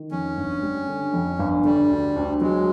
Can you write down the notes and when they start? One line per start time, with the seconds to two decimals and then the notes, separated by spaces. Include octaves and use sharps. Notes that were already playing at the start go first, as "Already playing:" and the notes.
Already playing: D#3
0.11 F2 C#4
0.37 G1
0.63 G3
0.88 D3
1.14 F2
1.39 G1
1.64 D3 G3
1.90 D2
2.16 D2
2.41 F#3 G#3